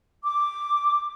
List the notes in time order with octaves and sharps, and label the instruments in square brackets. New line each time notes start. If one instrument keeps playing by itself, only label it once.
[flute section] D6